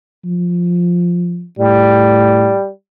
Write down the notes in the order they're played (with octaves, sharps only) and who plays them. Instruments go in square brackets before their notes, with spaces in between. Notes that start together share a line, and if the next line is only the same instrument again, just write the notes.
[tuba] F3
[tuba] A2 [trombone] G3